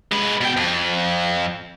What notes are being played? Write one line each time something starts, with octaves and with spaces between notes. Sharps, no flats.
G#3 B4
B2 G5
F2